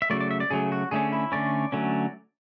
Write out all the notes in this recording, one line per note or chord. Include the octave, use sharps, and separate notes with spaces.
E5
C#3 F#3 A3 D5
D5
E5
D5
C#3 F#3 A3 G#4
F#4
D3 A3 C#4 G#4
E4
D3 A3 C#4 D5
D3 F#3 A3 C#4